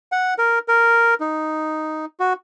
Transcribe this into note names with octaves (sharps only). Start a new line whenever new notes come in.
F#5
A#4
A#4
D#4
F#4